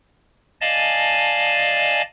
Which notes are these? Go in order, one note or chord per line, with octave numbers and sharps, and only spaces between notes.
D5 D#5 F5 G#5 A5